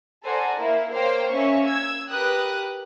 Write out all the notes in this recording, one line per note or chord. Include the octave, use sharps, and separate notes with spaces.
A4 C5 D5 F#5 G#5 A#5
A#3 E4
A#3 C5 C#5 F5 G5
A#3 C#4 E5 C#6
E6 G#6
G4 A#4 B4 G5 D#6 F#6